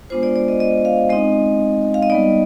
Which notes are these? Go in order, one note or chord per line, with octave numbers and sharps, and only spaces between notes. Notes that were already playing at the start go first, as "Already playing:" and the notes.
G#3 B3 D4 F4 C5
D5
D5
D#5
D#5
F5
G#3 C4 D#4 D#5
F5
D#5
G3 B3 D#4 D5